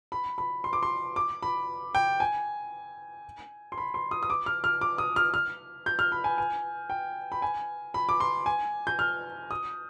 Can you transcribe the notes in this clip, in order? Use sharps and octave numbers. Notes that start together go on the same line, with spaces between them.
B5
B5
C6
D6
C6
D6
B5
G5
G#5
C6
B5
C6
D#6
D#6
D6
F6
F6
D6
D#6
F6
F6
G6
F6
B5
G#5
G#5
G5
B5
G#5
B5
D6
C6
G#5
G6
F6
D#6